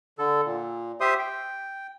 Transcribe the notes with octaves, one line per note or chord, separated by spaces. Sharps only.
D3 A4
A#2
G4 C5 E5 C6 D#6
G5